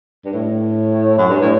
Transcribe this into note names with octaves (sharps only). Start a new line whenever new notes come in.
G2
A2
F#2
G2
A2